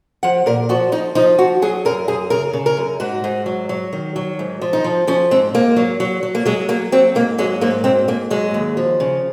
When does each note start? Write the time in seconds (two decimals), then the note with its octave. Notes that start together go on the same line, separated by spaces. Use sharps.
0.23 F3 F#5
0.46 A#2 A#4
0.69 F3 F#4
0.92 F3 D#4
1.15 F3 D#4
1.39 F3 F#4
1.62 F#3 G#4
1.85 F#2 A#4
2.08 F#2 G#4
2.30 C#3 A#4
2.53 C#3
2.66 A#4
2.77 F#2
3.00 G#2 F#4
3.24 G#2
3.46 F#3
3.69 F#3
3.93 D#3
4.16 F#3
4.39 G#2
4.61 F3
4.73 D#4
4.84 F3
5.07 F3 C#4
5.31 G#2 C4
5.54 G#2 A#3
5.76 F#3
6.00 F#3
6.23 F#3
6.35 A#3
6.45 F#3 G#3
6.68 F#3 A#3
6.92 F#3 C4
7.15 G#2 A#3
7.38 F#3 G#3
7.61 G#2 A#3
7.84 G#2 C4
8.08 G#2 A#3
8.30 F#3 G#3
8.54 D#2
8.77 F3
9.00 C#3